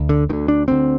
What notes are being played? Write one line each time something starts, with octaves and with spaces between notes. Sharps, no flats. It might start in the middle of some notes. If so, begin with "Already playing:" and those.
Already playing: D2
D3
D2 D3 D#3
D4
D2 D3 C4